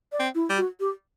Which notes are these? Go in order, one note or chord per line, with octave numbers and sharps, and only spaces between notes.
D5
C4
E4
G3
F#4
G4